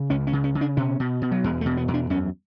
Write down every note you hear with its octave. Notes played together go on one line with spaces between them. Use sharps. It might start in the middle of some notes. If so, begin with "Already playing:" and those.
Already playing: C#3
C#2 C#4
C#4
C#3
C#4
C#3
D4
B2 C#4
B2
B2
F#3
E2 G#3
A3
B2
B3
E2
D4
F#2 C#4